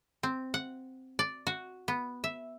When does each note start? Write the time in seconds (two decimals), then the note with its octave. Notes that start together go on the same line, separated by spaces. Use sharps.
0.23 C4
0.54 F#5
1.19 D5
1.47 F#4
1.88 B3
2.24 E5